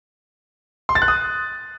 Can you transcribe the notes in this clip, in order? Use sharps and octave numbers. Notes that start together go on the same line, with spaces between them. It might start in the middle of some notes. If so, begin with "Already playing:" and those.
C6
A6
F#6
D#6